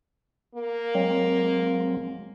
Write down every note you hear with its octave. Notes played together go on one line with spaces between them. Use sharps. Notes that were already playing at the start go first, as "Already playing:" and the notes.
A#3
F#3 G#3 C4